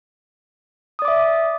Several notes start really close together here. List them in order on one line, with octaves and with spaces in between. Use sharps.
D#6 D5 D6 E5